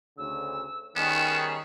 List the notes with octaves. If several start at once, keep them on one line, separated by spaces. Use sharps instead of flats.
D2 C#3 E6
D#3 G3 B3 C#4 G#4 E7